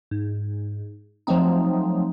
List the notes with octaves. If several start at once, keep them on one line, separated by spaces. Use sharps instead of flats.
G#2
F3 F#3 A3 C4 D#4